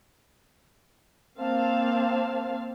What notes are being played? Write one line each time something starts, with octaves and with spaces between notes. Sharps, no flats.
A#3 C4 F5 A5